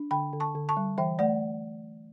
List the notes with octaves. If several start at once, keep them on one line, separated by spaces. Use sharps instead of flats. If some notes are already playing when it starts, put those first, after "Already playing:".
Already playing: D4
D3 G5 B5
D3
A5 C#6
D3
A5 C#6
G3
E3 E5 G5
A3 D5 F#5